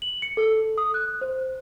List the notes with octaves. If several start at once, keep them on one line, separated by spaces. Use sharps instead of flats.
F#7
C#7
A4
D#6
F#6
C5